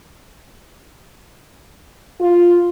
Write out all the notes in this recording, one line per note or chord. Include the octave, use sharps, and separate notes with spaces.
F4